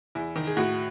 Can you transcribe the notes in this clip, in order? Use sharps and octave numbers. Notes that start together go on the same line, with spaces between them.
E2 E4
D#3
G#4
A2 F#4